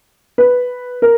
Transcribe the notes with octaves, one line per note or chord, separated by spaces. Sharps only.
B4
A#4